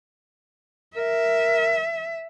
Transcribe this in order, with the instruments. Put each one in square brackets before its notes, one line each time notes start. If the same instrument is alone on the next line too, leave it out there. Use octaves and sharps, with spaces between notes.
[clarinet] A#4 [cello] E5